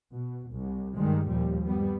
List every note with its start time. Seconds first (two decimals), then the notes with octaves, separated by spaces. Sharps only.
0.13 B2
0.52 C2
0.95 G2 D#3 G3 G#3
1.28 D#2 A#2 F3 G3
1.62 G2 G3 B3